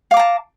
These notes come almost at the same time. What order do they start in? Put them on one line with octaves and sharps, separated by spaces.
F5 D6 A#5 A5